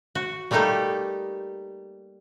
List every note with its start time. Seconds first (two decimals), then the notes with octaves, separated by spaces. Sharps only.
0.15 F#4
0.51 G3 A3 A#3 D#4 G4 A4